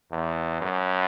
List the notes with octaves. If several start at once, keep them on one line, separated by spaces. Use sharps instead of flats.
E2
F#2